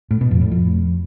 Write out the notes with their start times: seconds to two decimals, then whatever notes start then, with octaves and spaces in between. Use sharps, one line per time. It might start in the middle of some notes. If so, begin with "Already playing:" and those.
0.11 A2
0.21 B2
0.31 F2
0.41 A2
0.52 F2